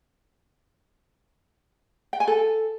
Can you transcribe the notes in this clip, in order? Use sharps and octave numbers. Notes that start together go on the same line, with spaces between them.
G5
G#5
A4